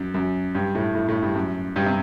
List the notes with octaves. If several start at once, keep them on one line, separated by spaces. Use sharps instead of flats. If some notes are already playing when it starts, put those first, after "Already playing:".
Already playing: F#2
F#2
G2
A2
A2
A2
G2
F#2
G2
C3